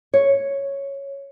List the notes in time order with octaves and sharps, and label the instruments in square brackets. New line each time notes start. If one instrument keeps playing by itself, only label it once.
[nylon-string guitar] C#5